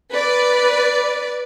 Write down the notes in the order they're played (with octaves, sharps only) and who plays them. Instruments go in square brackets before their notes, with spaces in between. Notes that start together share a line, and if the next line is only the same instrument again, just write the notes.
[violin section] B4 D5